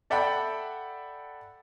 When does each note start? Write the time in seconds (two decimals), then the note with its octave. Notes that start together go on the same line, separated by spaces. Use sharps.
0.10 A4 D5 E5 F#5 G5 B5